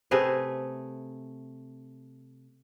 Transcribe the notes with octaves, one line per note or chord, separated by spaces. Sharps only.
C3 A3 G#4 B4